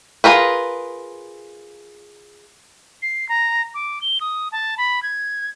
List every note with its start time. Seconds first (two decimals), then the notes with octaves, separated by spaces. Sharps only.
0.24 F4 G#4 A#4 B4
3.02 C7
3.29 A#5
3.74 D6
4.02 G7
4.21 D#6
4.52 A5
4.78 B5
5.03 G#6